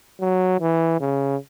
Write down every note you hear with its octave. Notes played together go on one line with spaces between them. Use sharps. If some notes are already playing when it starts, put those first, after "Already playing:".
F#3
E3
C#3